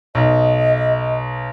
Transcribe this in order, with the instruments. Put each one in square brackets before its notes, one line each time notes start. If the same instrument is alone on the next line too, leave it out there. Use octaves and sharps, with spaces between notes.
[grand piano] B1 [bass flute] D#5